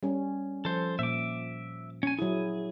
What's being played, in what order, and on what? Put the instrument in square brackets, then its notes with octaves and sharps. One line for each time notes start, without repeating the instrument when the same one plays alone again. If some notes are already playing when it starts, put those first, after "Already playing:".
[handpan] G3 C#4
[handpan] F3 [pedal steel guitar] A4 C5
[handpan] A#2 [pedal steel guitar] E5 D6
[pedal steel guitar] C#4 G#5
[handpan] F#3 E4 [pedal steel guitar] G#4